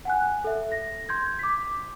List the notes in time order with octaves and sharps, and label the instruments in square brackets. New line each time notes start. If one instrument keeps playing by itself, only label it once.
[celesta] F#5 G#5 F#6
A4 E5
A#6
C6 G6 G#6
D6 B6